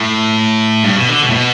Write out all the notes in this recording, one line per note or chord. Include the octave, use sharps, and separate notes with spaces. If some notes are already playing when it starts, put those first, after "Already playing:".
Already playing: A2
G2
B2
D3
B2
A2
B2